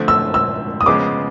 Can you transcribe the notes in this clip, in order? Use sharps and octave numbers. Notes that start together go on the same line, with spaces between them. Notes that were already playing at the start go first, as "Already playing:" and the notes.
Already playing: D3 F3 A3 C4
E6
E6
D#6
C#3 F3 G#3 B3 D6